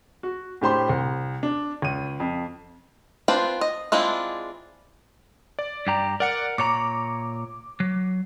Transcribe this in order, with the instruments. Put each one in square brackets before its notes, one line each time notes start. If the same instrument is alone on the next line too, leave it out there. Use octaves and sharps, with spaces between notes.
[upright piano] F#4
A2 D4 G4 C5 B5 C6
C2
D4
C#2 D#7
F2
[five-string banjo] C4 D4 F4 B4 C5
D#5
G#3 C4 D4 E4 F4
[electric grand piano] D5
[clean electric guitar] G2 G4 A#5
[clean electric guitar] A#4 [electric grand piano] D5 F#5 C#7
[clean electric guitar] A#2 C#5 A#5 [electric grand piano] D6
[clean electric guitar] F#3